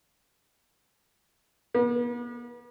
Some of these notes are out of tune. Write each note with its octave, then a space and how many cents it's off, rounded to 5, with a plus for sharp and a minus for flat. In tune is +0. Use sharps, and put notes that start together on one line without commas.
B3 -45